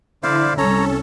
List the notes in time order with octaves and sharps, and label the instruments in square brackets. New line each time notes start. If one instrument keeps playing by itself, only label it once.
[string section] D3 [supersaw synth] E4 [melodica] C5 D5 F5
[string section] C2 [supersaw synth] C#4 A4 [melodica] C#5 A#5